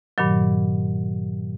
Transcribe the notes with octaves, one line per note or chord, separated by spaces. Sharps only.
G2 A#2 D#3 F#3